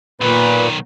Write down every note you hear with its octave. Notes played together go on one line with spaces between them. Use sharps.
B1 A#2 D#3 B4